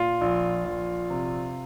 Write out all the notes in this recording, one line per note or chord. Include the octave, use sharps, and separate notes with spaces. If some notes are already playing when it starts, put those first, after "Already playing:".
Already playing: A#2 F4
A#1
A#1
C3